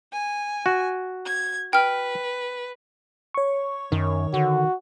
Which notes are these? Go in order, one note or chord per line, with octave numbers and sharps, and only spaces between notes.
G#5
F#4
G#6
B4 G5 F6
C#5 C#6
F#2 D#3
D3 F#4